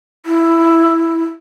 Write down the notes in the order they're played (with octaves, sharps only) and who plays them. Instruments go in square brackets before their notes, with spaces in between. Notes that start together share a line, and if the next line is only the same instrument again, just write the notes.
[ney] E4